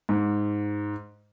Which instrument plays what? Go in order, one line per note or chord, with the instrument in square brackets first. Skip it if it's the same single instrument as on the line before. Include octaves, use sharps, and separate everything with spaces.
[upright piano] G#2